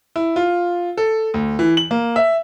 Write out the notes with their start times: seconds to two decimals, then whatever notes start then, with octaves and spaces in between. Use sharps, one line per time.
0.16 E4
0.36 F4
0.97 A4
1.34 D2
1.59 E3
1.77 F#7
1.91 A#3
2.16 E5